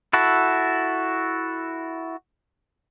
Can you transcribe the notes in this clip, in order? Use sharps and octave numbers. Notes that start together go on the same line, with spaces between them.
E4 F#4 A4